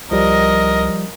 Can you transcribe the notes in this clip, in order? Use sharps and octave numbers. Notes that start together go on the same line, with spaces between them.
C2 F3 G3 A#4 D#5